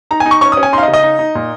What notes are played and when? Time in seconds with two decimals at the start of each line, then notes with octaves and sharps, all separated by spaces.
0.11 D#4 A#5
0.20 G#5
0.26 D#4
0.31 C#6
0.41 C#4 C#6
0.52 D#6
0.57 C#4
0.63 G#5
0.73 D#4 C6
0.78 F5
0.83 D#5
0.88 C#3
0.93 D#5
1.04 D#4
1.19 D#4
1.35 A#2